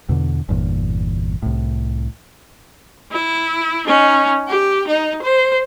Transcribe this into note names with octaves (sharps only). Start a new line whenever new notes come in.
E2 B2 D3
G1 E2 A#2
C2 A2
E4
C#4 D#4
G4
D#4
C5